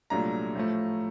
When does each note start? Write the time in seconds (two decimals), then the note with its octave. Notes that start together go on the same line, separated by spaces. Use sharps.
0.10 C2 A#2 F#3 A3 D4 A#5
0.55 A2 F3 A3